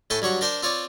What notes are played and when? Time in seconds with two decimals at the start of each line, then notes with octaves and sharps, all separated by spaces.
0.10 A2 A4 G5 G#5 C#6
0.22 G2 F#3 C#5 F#5
0.41 D4 A#4 C5 G5
0.63 C4 F4 C#5 D5